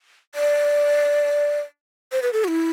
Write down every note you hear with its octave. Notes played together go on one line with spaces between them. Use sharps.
D5
C5
B4
A4
F#4
E4